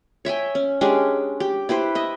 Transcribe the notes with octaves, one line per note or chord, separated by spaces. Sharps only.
C#5 E5 G5 G#5
C#4
G#3 C#4 D4 G4
G4
E4 G4 B4 C5
D#5 E5